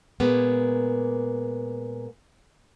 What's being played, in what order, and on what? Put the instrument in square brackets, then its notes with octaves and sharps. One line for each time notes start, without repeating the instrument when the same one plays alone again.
[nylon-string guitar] A#2 G#3 A#3 B3